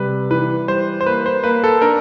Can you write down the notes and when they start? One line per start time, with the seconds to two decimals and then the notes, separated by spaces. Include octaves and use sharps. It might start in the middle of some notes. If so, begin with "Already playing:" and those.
Already playing: C3 G3 B4
0.31 E3 B4
0.68 G3 C5
1.01 C5
1.06 A#3 B4
1.26 C5
1.44 A#3 B4
1.64 A4
1.82 D4 A#4